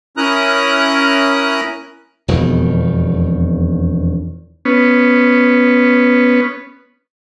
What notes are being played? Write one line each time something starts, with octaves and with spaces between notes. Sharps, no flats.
C#4 E4 A#4 A#5 D#6 F#6
E1 F2 B2 D#3
B3 C#4